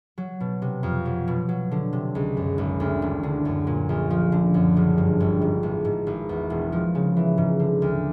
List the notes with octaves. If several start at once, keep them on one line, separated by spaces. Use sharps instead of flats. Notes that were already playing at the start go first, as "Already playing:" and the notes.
F#3
B2
C3
F2
F#3
B2
F#3
D3
C3
C#2
F#2
G#1
D2
E1
D3
F#2
A#2
A#1
F3
D3
F#2
F#1
G2
G1
G#2
A1
G#2
G#1
E2
E1
F3
C#3
E3
G#2
D3
D2